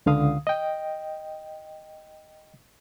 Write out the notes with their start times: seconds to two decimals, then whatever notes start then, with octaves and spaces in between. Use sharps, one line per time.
0.06 C#2 D3 F5 D#6
0.47 D#5 G5